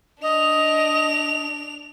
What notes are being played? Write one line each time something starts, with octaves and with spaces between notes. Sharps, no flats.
D4 D#5 F7